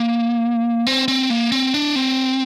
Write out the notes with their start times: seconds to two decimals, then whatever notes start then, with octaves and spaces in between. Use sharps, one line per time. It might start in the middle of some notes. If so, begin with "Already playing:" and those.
Already playing: A#3
0.87 C4
1.08 C4
1.30 A#3
1.52 C4
1.74 D4
1.96 C4